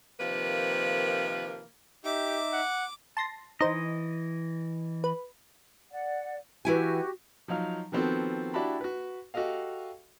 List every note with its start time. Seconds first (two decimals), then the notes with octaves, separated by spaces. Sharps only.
0.20 C3 D#3 F3 A#3 B4
2.05 D#4 G4 E5 D6
2.53 F#5
3.17 A5 C6 A#6
3.61 E3 D#4 C5 D#5
5.04 B4
5.91 D5 F#5
6.65 E3 E4 F#4 G4 G#5
7.48 F3 F#3 D#4 F5 F6
7.92 D#3 F3 B3 C4 F#4 A4
8.54 D4 E4 F#4 G4 A5 B5
8.81 F#4 B4
9.34 F#4 G4 A4 D#5 F5